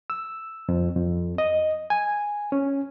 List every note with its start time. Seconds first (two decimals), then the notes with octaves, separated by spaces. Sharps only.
0.10 E6
0.69 F2
0.96 F2
1.38 D#5
1.90 G#5
2.52 C#4